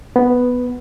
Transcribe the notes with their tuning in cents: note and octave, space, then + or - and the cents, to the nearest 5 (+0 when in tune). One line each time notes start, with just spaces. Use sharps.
B3 +0